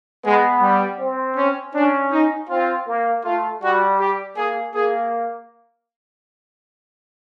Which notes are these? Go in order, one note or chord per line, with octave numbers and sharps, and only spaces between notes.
G#3 B3
G3
C4
C#4
C#4 D4
D#4
C4 F4
A#3
A3 F4
G3 F#4
G4
A#3 G#4
A#3 G#4